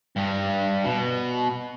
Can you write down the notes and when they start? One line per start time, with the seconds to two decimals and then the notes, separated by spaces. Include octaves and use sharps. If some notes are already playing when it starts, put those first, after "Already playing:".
0.16 G2 G3
0.84 B2